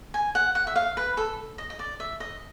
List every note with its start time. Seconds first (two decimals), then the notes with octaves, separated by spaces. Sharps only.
0.14 G#5
0.35 F#5
0.55 F#5
0.67 E5
0.76 F5
0.97 B4
1.17 A4
1.58 D#5
1.70 D#5
1.79 D5
2.00 E5
2.20 D#5